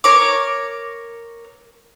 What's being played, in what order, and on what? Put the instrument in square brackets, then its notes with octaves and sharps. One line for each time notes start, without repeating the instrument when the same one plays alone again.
[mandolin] A#4 C#5 D6